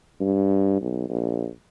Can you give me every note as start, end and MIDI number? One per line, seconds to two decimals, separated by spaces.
0.20 0.81 43
0.81 1.07 35
1.09 1.47 34